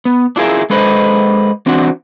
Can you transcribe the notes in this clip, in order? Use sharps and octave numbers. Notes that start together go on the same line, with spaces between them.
B3
D4 E4 F4 G#4 A#4 E5
G#3 A4 B4 C5 D#5
E3 C4 D4 F#4